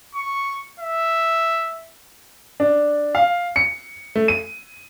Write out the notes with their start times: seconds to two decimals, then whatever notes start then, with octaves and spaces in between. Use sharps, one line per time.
0.15 C#6
0.80 E5
2.60 D4
3.15 F5
3.56 C#7
4.16 A3
4.28 D#7